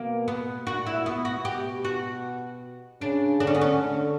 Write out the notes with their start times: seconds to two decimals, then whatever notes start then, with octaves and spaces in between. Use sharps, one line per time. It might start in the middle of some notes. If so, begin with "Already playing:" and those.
Already playing: B2 A#3
0.28 B3
0.67 A#2 F#4
0.86 E4
1.06 B2 B3
1.25 F#4
1.45 G4
1.84 F#4
3.01 C#3 D4
3.40 D3 D4
3.47 C#4
3.54 B3
3.61 C#4
3.80 D3